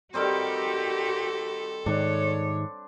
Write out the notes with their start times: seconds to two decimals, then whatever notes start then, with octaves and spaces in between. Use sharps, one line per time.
0.14 D#3 G3 C4 F#4 G4 A4
1.86 G#2 D#3 D4 C#5